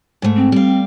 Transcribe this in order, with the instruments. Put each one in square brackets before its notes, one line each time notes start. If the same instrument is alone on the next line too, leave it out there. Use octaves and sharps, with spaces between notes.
[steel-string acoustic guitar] G#2 A3
[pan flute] C4
[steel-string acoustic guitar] G3 F5